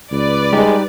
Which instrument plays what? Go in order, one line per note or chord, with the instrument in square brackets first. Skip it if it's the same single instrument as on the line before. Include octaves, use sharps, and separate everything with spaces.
[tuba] C#2 [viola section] B4 D5
[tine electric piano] G3 D#4 G4 [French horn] G#3